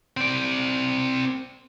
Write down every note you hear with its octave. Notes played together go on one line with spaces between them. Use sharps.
C4 D5